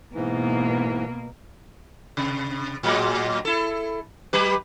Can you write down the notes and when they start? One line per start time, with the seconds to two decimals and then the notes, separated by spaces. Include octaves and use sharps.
0.14 G#2 B2 E3 A#3
2.17 C3
2.83 A2 F#3 G#3
3.45 E4 A4
4.33 F#3 G4 B4